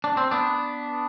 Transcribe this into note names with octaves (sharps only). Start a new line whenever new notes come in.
D4
C4
B3 D4